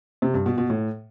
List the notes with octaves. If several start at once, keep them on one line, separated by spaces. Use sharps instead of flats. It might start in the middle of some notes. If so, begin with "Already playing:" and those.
C3
G2
B2
B2
A2